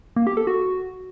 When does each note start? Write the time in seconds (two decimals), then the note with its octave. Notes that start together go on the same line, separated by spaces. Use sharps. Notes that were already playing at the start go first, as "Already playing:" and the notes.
0.16 A#3
0.27 G4
0.37 A4
0.47 F#4